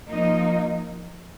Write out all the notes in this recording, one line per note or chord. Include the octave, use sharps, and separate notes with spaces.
F3 A#3 D#4